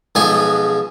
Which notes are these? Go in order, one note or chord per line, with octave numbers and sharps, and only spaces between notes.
B1 F3 G#3 G#5 C#6